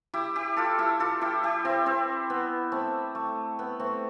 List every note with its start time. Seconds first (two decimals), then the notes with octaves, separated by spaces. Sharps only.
0.14 E4 G4
0.36 E4 G4
0.57 F4 A4
0.78 E4 G4
1.00 F4 A4
1.21 E4 G4
1.43 E4 G4
1.65 C4 E4
1.86 C4 E4
2.30 B3
2.72 A3 C4
3.15 A3
3.59 B3
3.80 A3 C4